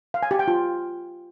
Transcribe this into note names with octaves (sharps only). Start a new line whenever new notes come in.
F5
G#5
G4
G5
F4